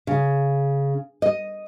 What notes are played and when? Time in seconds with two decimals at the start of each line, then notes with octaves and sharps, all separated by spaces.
0.07 C#3
1.22 D#5